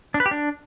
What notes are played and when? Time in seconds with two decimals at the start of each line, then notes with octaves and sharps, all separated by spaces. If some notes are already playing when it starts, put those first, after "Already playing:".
0.14 D4
0.20 B4
0.26 G4
0.31 D4